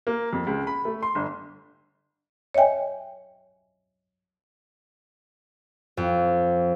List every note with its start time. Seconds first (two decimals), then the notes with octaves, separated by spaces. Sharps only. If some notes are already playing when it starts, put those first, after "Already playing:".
0.07 A#3
0.33 F2
0.47 C#2
0.67 B5
0.85 A3
1.03 C6
1.15 G1
2.54 C#5 D#5 E5 G5 G#5
5.97 F2